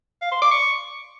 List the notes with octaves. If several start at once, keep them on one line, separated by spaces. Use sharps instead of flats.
F5
C6
D6
C#6